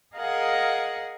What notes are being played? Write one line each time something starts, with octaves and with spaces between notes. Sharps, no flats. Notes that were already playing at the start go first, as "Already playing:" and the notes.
G#4 A#4 D#5 F5 F#5 G#5